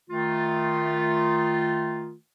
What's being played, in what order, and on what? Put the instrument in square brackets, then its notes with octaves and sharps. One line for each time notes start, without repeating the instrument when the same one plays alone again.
[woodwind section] D#3 A3 F4